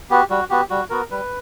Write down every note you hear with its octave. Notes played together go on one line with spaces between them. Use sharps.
B3 F#4 G4
G3 F#4
B3 F#4 G4
G3 F#4
B3 F#4 A#4
G3 B4